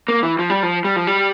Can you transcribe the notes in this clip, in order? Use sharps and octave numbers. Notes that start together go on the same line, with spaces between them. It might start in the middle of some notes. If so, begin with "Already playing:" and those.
A#3
E3
F3
G3
F3
G3
F3
G3